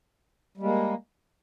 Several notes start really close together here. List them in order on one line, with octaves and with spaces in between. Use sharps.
G3 G#3 A#3